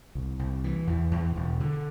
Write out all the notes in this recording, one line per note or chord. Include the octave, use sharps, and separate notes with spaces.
C2
C2
E3
E2
E2
E1
D3